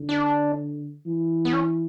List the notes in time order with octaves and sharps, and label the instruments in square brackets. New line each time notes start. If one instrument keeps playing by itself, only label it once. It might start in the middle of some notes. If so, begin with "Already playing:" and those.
Already playing: [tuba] D3
[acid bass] D4
[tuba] E3
[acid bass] B3
C#4